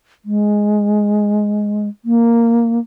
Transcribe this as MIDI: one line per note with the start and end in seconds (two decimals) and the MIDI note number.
0.25 1.88 56
2.05 2.79 58